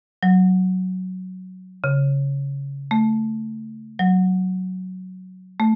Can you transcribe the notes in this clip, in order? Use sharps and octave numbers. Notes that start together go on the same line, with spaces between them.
F#3
C#3
A3
F#3
A3